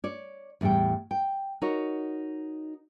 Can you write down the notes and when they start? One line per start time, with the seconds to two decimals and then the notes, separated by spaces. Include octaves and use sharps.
0.04 C#5 D5
0.61 E2 A2 G3 A4 G5
1.11 G5
1.62 D#4 F#4 A#4 C#5